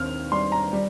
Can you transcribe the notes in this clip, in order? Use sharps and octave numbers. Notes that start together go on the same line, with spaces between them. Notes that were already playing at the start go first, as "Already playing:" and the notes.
Already playing: D#2 C4 F6
G3 C6
A#5
G3